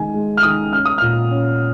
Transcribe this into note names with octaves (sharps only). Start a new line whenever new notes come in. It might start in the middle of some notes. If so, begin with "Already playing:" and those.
Already playing: D#3 G#3 G#5
G#3
F6
D#3 D#6
C#4 F6
D#6
A#2 F6
C#4